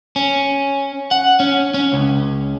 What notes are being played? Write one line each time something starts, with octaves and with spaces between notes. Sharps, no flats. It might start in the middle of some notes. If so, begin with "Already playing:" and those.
C#4
F#5
C#4
C#4
C#2